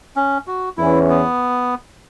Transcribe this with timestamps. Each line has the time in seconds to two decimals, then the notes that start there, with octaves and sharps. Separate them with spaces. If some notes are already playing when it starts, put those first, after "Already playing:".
0.16 C#4
0.47 F#4
0.77 E2 E3 C#4 E4
1.09 B3